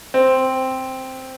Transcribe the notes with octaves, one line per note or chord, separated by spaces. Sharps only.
C4